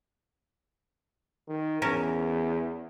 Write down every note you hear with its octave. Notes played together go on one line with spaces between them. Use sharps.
D#3
E2 C#4 A#4 A5